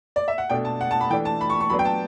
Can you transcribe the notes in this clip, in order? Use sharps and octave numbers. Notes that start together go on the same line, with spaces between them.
D5
E5
F#5
B2 A3 D4 G5
A5
F#5
A5
B5
E3 A3 D4 G5
A5
B5
C#6
C#6
F#3 B3 D4 B5
G5
A5